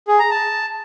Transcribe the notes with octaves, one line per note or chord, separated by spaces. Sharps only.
G#4
A#5
A5